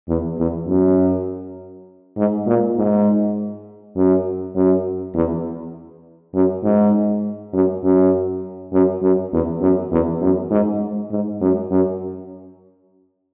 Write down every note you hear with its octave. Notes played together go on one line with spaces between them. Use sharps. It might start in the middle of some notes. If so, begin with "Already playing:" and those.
E2
E2
F#2
G#2
A#2
G#2
F#2
F#2
E2
F#2
G#2
F#2
F#2
F#2
F#2
E2
F#2
E2
F#2
G#2
G#2
F#2
F#2